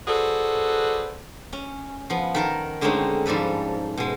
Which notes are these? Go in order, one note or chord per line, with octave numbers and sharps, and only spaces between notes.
F#4 G#4 A4 B4 C5 D5
C#4
F3 B3
D#3 A#4 A5
D3 G#3 A3 C4 C#4 D#4
G#2 F3 G3 A4 B4
B2 G#3